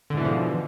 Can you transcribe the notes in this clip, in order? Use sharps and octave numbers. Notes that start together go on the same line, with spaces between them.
G#2 B2 D3 E3 F3